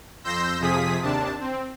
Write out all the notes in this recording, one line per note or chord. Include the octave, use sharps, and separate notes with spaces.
F2 C6 E6 G6 A#6
F2 C3 F3 G#4 D#6 B6
D#2 C3 D4 A5
C4